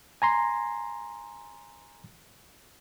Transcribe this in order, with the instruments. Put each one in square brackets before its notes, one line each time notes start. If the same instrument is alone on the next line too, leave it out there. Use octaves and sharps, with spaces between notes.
[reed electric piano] G#5 A#5 C6